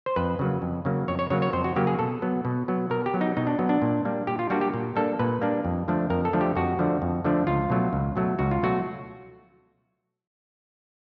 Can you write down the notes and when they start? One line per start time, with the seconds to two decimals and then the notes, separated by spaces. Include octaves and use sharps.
0.06 C5
0.16 F2 B4
0.39 C#3 F#3 A#3
0.62 F2
0.85 C#3 F#3 A#3
1.08 F2 C#5
1.19 C#5
1.30 C#3 F#3 A#3 C#5
1.42 C#5
1.53 F2 C5
1.64 F#4
1.76 C#3 F#3 A#3 G4
1.87 G#4
1.99 B2 A4
2.22 F#3 B3
2.45 B2
2.68 F#3 B3
2.90 B2 A#4
3.06 G4
3.14 F#3 B3
3.21 D#4
3.37 B2 D#4
3.47 D4
3.59 F#3 B3
3.69 D4
3.82 A#2
4.05 G3 A#3 D4
4.27 A#2 G4
4.39 F4
4.50 G3 A#3 D4 F#4
4.61 G4
4.74 A#2
4.96 G3 A#3 D4 A4
5.19 A#2 B4
5.41 G3 A#3 D4
5.65 F2
5.88 D3 F3 A3 D4
6.10 F2 A#4
6.25 A4
6.33 D3 F3 A3 D4
6.41 G4
6.56 F2 F#4
6.79 D3 F3 A3 D4
7.02 F2
7.24 D3 F3 A3 D4
7.47 C#2 F4
7.70 B2 F#3 A3
7.93 C#2
8.16 B2 F#3 A3
8.39 C#2 F#4
8.51 F4
8.62 B2 F#3 A3 F#4